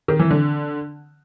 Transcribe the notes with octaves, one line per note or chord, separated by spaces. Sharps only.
D#3
E3
D3